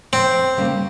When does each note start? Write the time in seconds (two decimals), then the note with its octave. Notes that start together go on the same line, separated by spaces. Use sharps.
0.13 F2 C4
0.57 C#3 G3 A#3